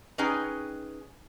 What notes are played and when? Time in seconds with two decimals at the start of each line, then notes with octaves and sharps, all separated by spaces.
0.18 C#4 D#4 G#4 B4 G5 G#5